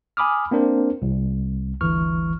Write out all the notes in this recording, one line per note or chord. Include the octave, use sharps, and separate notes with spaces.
G#5 B5 D6 D#6 F6
A#3 C4 D4 A#4 C5
C2
G1 D2 E3 C#6 F6